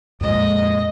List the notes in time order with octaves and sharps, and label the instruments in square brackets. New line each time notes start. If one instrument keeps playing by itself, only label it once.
[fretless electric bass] F2 A#2 G#3 [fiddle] D#5